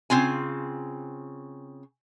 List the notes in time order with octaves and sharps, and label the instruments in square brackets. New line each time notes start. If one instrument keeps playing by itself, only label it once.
[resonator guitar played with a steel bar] C#3 C4 F4 G#5